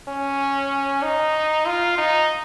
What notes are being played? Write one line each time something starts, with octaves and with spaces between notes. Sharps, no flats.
C#4
D#4
F4
D#4